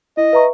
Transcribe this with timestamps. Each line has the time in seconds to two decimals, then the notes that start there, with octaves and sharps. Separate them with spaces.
0.17 E4 D#5
0.33 B4 E5 A#5 C#6